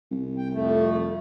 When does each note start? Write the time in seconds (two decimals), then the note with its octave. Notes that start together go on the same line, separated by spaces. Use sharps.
0.11 C2
0.37 G5
0.53 F2 A3